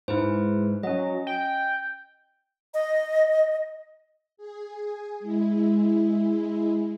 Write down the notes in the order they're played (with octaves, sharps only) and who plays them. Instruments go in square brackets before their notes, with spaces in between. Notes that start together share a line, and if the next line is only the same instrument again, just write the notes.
[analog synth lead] G#2 [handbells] E4 B4 C5
[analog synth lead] F#3 [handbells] C#4 D#5
[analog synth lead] G5
[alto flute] D#5
[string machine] G#4
G#3 E4